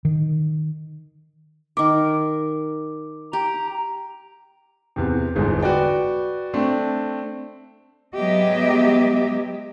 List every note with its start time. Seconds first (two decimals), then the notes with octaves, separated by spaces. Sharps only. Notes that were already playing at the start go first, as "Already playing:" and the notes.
0.05 D#3
1.77 D#3 A#4 D6
3.33 G4 A#5
4.96 E2 C3
5.36 G1 E2 G#2
5.62 F#4 B4 D5 G5
6.54 A3 C4 D4
8.16 F#3 G#3 B3 G4 D#5 E5